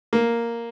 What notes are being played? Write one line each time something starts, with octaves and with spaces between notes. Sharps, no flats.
A#3